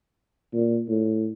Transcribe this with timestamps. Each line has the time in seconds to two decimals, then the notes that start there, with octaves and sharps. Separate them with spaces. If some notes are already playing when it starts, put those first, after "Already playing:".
0.54 A#2
0.88 A2